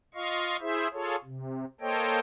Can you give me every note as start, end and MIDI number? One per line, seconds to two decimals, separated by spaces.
0.15 0.57 65
0.15 0.57 75
0.15 0.57 77
0.15 0.57 85
0.61 0.88 64
0.61 0.88 68
0.61 0.88 72
0.61 0.88 76
0.93 1.16 65
0.93 1.16 68
0.93 1.16 69
0.93 1.16 73
1.24 1.65 48
1.81 2.20 58
1.81 2.20 69
1.81 2.20 72
1.81 2.20 73
1.81 2.20 75
1.81 2.20 79